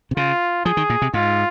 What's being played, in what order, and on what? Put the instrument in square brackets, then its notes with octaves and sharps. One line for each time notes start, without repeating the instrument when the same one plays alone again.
[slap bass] C3
[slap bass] C#3 [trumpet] F4
[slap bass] F3 [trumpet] G#4
[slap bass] D#3
A#2
C3
[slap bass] G#2 [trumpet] F4